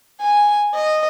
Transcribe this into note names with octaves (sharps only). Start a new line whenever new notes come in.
G#5
D#5